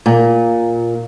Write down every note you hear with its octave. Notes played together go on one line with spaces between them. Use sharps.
A#2